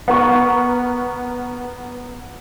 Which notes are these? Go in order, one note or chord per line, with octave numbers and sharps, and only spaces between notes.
B3 A#4 C#6